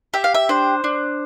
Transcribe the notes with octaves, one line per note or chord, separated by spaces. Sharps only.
G4 E5
F5
E5
D4 C5
D4